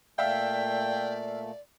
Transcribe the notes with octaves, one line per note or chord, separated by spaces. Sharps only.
A#2 A3 D5 E5 F5 G5